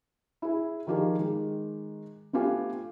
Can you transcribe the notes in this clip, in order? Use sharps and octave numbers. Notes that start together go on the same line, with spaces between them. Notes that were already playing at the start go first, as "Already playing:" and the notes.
E4 G#4
D#3 F3 F4 G4 G#4 A#4
D#3 G#3
A3 B3 D4 F4 G4 G#5